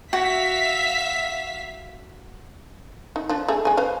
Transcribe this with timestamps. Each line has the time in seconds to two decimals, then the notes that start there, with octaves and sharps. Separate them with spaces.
0.13 F#4 E5 F5 B6
3.16 D#4
3.29 F3 D4
3.48 A3 G#4 A4
3.65 G#3 G#5
3.77 B4 C5 F5